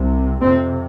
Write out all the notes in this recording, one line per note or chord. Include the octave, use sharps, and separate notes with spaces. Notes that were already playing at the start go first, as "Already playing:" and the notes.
Already playing: C2 C3
F2 C3 C4